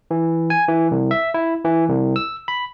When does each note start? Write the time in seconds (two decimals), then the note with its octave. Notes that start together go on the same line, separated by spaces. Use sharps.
0.11 E3
0.50 G#5
0.68 E3
0.91 C2
1.11 E5
1.34 E4
1.65 E3
1.90 C2
2.16 E6
2.48 B5